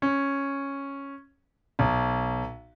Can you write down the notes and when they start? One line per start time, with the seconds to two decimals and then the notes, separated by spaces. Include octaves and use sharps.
0.02 C#4
1.79 B1